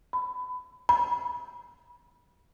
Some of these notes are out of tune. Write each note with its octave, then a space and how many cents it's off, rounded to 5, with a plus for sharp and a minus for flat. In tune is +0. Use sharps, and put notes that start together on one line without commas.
B5 +30
B5 -25